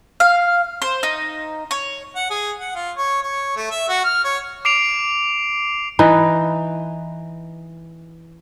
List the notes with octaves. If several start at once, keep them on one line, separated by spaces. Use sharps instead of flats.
F5
C5
D#4
C#5
F#5
G#4
F#5
F4
C#5
C#5
A3
E5
F#4
F6
C#5
D6 C7 D7 F7
E3 D#4 B4